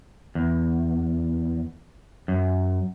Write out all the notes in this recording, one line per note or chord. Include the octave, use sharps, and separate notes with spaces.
E2
F#2